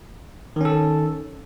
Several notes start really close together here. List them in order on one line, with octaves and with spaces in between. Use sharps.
D#3 C#4 A4